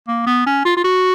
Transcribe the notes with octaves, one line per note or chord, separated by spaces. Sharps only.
A#3
B3
C#4
F4
F4
F#4